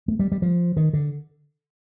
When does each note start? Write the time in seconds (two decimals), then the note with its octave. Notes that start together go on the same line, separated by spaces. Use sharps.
0.08 A3
0.19 G3
0.32 G3
0.42 F3
0.77 D#3
0.93 D3